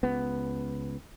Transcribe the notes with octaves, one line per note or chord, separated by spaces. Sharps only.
C#2 B3